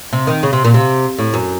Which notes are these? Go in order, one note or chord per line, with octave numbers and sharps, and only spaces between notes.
C3
D#3
C#3
C3
A#2
C3
A2
F#2